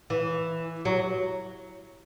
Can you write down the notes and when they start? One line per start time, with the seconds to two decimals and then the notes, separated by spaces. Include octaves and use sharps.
0.10 E3
0.85 F#3